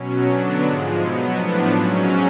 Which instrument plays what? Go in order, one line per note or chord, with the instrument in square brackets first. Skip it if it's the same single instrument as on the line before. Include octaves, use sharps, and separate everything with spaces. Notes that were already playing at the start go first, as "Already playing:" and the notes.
Already playing: [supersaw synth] B2 F#3 C#4
D3 F#3 B3 D4
G#2 F3 G#3
B2 F#3 B3
A2 F3 B3 D4
G#2 F#3 C#4